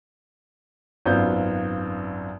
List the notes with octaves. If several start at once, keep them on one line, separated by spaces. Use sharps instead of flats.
G#1 F#2 B3 F4 C5 G6